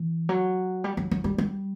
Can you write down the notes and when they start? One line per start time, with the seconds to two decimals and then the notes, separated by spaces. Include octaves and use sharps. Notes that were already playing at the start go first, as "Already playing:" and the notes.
Already playing: E3
0.29 F#3
0.84 G3
0.97 F#3
1.11 F#3
1.24 G3
1.38 G3